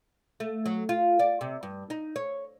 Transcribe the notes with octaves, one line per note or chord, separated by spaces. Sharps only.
A3
F#3
F4
D5
C3
G2
D#4
C#5